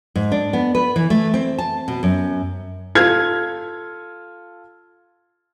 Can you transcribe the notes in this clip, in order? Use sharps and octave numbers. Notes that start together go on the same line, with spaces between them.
G#2
D4
B3
B4
E3
A3
C4
A5
B2
F#2
F4 A4 F6 G#6